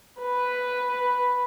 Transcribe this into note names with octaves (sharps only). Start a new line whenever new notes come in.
B4